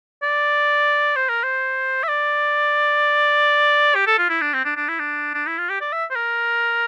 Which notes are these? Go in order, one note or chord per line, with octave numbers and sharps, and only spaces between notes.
D5
C5
A#4
C5
E5
D5
G4
A4
F4
E4
D4
C4
D4
D4
E4
D4
D4
E4
F4
G4
D5
E5
C5
A#4